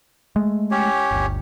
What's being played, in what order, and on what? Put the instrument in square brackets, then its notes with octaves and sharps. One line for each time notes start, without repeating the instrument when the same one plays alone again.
[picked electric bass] G#3 A3
[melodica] C#4 G4 C#5
[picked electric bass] G1 D2